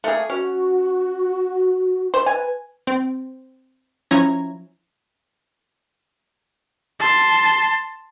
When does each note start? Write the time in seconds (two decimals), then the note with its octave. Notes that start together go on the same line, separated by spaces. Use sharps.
0.04 A3 A#3 G#4
0.30 C#4 F#4
2.14 C5
2.26 B4 G#5
2.87 C4
4.11 F3 C#4 E4 A#5 G#6
7.00 A5 C6